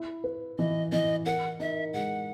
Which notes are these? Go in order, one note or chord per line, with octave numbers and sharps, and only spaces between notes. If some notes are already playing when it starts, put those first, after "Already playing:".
Already playing: E4
B4
E3 D#5
E3 D#5
A#4 F#5
D#4 E5
G#3 F#5